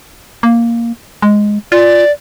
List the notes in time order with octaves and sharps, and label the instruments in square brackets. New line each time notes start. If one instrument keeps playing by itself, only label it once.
[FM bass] A#3
G#3
[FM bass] F4 [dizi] D5